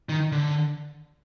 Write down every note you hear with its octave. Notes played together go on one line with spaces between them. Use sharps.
D#3
D3